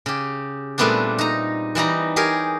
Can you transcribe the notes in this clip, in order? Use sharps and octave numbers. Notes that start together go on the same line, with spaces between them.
C#3 G4
A#2 G3 A3 B3 C4 D4
D#4 A#5
E3 G3 D#4 A#5
G4 G#4 A#4 C#5